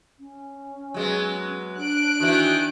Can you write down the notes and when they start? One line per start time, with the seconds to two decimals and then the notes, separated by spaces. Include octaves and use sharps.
0.19 C#4
0.94 F#3 G#3 B3
1.79 D4 F#6 D7
2.20 D#3 E3 F#4